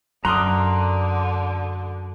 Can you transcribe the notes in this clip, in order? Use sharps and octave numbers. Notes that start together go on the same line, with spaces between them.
F#2 D3 A#5 C6 D6 D#6 F6 F#6